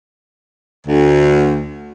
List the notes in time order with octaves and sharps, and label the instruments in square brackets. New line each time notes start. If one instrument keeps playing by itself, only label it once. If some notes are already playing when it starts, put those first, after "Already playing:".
[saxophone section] D2